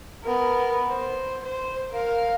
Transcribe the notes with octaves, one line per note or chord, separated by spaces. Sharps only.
B3 A#4
C5
C5
A#4 F5